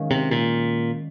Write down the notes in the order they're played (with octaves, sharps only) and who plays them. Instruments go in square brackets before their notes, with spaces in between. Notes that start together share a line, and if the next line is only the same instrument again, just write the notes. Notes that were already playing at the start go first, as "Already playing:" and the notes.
Already playing: [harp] D#3 G#3 C#4 F4
[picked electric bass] C3
A#2